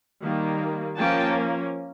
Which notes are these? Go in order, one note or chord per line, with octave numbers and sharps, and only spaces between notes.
D#3 G3 A#3
F3 A#3 C#4 G5 A5